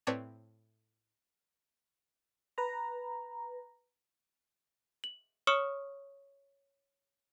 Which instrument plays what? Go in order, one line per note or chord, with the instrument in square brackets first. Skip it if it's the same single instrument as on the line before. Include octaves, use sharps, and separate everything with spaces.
[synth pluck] A2 C4 B4 C#5 D5 A5
[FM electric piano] B4 A#5
[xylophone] F#7
C#5 C#6 D#6 F6 C#7 E7